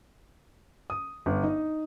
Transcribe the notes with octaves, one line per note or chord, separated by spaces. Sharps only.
D#6
G1
D#4